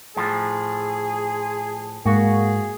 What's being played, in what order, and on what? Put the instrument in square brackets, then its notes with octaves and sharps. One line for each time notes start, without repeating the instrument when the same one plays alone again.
[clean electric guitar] A2 F3 [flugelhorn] G#4
[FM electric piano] G#2 [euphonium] A#3 [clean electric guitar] F#4 [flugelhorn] G#4